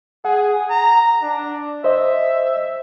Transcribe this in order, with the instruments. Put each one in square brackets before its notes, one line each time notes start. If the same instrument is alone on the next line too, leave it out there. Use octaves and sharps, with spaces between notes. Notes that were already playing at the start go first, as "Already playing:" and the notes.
[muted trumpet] G#4 [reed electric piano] F#5
[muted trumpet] A#5
D4
[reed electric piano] C5 D#5 [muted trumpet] E5